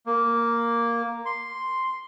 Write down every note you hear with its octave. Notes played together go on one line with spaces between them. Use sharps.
A#3
C6